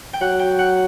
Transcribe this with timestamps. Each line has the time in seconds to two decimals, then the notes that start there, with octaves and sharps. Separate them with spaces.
0.13 G5
0.21 F#3 F#5
0.39 G5
0.59 F#5